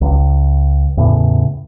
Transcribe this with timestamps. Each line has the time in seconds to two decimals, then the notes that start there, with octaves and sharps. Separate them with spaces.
0.01 C#2
0.97 E2 A2 C#3